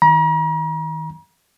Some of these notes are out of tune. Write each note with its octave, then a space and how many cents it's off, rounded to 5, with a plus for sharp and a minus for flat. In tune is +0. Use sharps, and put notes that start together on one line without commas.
D#3 +25 A#5 +40